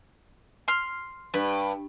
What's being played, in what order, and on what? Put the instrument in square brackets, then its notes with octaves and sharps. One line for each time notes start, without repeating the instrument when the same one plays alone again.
[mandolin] C6 F6
[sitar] G2 [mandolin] B4